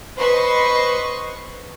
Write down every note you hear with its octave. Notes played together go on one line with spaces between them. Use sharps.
B4 C5 D#5 C6 C#6